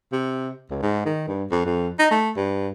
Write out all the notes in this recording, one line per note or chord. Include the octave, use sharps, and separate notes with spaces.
C3
C#2
G#2
D#3
G2
F2
F2
D#4
A3
G2